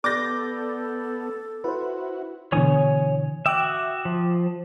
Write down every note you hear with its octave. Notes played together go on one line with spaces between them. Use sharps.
B3 A4 D5 D6 G6 A6 A#6
E4 F#4 B4 C5
B2 D3 E3 C#5 G#5 D#6
F#4 E5 G5 D6 D#6
F3